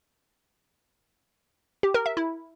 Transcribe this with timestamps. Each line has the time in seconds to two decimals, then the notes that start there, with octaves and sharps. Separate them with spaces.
1.83 G4
1.94 A#4
2.06 E5
2.17 E4